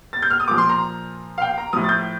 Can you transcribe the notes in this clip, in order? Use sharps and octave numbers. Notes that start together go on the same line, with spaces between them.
A6
G6
F6
D#6
A#2 F3 D6
C6
A#5
F5
G5
A#5
A2 F3 D#6
A6
G6